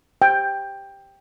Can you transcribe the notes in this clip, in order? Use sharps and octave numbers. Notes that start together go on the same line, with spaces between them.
G5